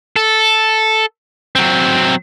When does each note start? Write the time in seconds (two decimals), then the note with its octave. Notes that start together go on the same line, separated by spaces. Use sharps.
0.16 A4
1.55 F#3 C4